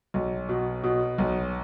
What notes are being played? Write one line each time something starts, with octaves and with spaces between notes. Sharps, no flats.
B1
B2
B2
B1